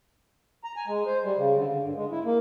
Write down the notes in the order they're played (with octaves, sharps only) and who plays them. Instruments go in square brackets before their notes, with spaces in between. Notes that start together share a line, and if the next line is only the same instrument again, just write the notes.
[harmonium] A#5
G#5
G#3
C5
G3
C#3
D3
D3
G2
G#3
E4
A#3